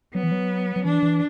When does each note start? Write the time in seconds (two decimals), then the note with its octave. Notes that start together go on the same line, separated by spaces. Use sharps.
0.14 F#3 B3
0.23 E3
0.32 F#3
0.76 F#3
0.85 E3 D4
1.03 E3